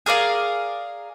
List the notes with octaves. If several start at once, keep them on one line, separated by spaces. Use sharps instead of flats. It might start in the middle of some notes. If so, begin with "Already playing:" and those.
G#4 A#4 D5 F5